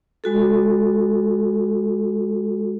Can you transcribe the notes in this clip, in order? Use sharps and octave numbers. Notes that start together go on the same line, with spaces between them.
G#3 F#4 A4